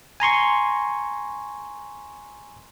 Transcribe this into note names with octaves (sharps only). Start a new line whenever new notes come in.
G#5 A#5 C6 C#6